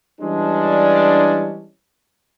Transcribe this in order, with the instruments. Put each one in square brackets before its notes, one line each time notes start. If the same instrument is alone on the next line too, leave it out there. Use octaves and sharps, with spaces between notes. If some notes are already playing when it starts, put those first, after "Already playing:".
[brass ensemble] E3 G3 G#3 C#4 D4